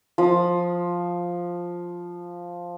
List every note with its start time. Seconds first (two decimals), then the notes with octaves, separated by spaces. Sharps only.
0.18 F3 D#6